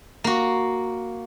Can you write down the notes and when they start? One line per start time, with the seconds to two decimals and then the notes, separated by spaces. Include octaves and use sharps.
0.24 A#3 F#4